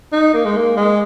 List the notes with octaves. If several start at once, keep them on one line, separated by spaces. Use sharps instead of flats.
D#4
A#3
G#3
A#3
G#3